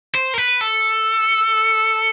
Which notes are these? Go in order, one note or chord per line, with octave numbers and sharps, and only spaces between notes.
C5
A#4
B4
A4